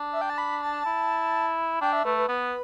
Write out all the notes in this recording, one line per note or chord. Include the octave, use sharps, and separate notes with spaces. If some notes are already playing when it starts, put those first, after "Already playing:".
Already playing: D4
E5
G5
A5
B5
A5
E4
D4 G5
E5
A3 B4
B4
B3 B4